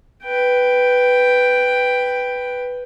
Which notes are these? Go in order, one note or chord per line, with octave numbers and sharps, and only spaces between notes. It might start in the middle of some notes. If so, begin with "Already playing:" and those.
B4 G5